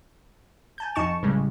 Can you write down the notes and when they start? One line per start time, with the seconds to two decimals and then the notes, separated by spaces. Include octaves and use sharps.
0.78 G#5 A5 G6
0.95 F2 D#4 A5 C#6 E7
1.22 A1 C#3 G3 G#3